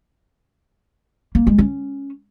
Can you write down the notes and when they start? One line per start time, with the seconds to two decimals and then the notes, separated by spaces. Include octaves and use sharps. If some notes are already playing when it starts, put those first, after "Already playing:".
1.35 A#3
1.47 G#3
1.58 C#4